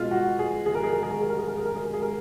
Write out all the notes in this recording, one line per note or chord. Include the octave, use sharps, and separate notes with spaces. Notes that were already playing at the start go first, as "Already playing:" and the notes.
Already playing: B2 G#3 F4
F#4
G#4
G#4
A#4
G#4
A#4
G#4
A#4
G#4
A#4
G#4
A#4
G#4
A#4
G#4
A#4
G#4
A#4